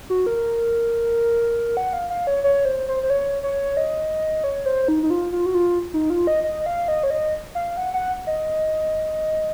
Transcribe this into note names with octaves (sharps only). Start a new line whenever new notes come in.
F#4
A#4
F#5
F5
F5
C#5
C#5
C5
C5
C5
C#5
C#5
D#5
C#5
C5
D#4
D#4
F4
F4
F#4
F4
D#4
F4
D#5
D#5
F5
D#5
C#5
D#5
F5
F#5
F#5
D#5